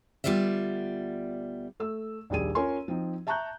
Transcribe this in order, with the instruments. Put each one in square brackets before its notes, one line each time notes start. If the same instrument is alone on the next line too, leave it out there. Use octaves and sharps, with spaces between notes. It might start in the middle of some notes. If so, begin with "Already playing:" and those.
[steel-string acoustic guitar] D2 G3 B3 F4 D5 E5
[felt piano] A3 E6
A#1 D#2 G3 G#4 D#7
C#4 F4 A#4 C#5 G#5 C6
F3 C4 D#4
E5 A5 A#5 C#6 F#6 G6